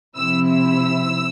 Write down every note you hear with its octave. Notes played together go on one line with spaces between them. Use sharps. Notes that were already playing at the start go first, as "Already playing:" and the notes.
C3 F3 C4 E4 E6
E6